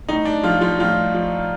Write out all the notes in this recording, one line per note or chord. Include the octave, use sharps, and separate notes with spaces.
A2 D#4
D4
F3 F4
F3 F4
A2 F3 F4
F3